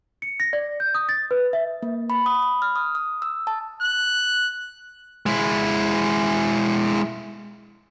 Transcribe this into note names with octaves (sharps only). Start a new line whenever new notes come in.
C#7
A#6
D5
G6
D#6
A6
B4
E5
A#3
B5
D#6
B5
F6
D#6
D#6
E6
A5
F#6
G#3 E4